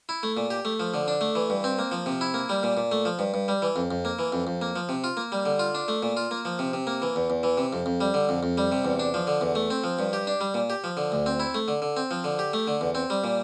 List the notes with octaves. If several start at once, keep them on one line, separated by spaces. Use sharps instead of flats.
E4
A3
A#2
G4
A3
F3
D3
D4
A3
E3
G2
C4
A#3
F3
C3
E4
A#3
G3
A#2
A#2
A3
F3
G2
G2
G3
E3
F2
F2
A#3
E3
F2
F2
A#3
F3
C3
F4
A#3
G3
D3
F4
D4
A3
A#2
F4
A#3
F3
C3
C3
A#3
E3
E2
E2
E3
C3
F2
F2
G3
D3
F2
F2
G3
C3
E2
D4
F3
D3
E2
A3
C4
F3
G2
G4
D4
G3
A#2
G4
F3
D3
D2
C4
E4
A3
D3
D3
C4
F3
D3
G4
A3
D3
E2
C4
G3
A#2